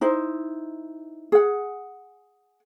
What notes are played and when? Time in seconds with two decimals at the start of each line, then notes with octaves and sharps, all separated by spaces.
0.01 D#4 E4 C5
1.32 G#4 F#5